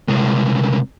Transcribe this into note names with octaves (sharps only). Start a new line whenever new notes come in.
C2 G#3